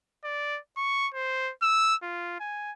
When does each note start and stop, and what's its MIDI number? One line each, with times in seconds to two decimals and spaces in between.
0.24 0.59 74
0.77 1.09 85
1.15 1.52 72
1.62 1.95 88
2.03 2.37 65
2.40 2.72 80